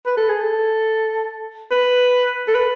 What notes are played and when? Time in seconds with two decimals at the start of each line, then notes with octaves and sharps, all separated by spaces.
0.06 B4
0.17 A4
0.29 G#4
0.41 A4
1.71 B4
2.48 A4
2.55 B4